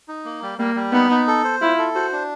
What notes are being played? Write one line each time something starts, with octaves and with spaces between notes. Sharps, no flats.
D#4
A#3
G3
G3 A#3
G3
B3 D#4
D#4
A4
C5
E4 F4
A4
F#4 C5
D4